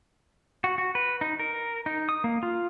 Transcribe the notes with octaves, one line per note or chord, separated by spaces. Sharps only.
F#4
F#4
B4
D#4
A#4
D#4
D#6
A#3
F4